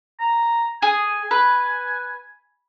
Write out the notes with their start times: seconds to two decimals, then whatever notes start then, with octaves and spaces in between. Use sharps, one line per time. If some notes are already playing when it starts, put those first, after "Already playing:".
0.20 A#5
0.82 G#4 G#5
1.31 B4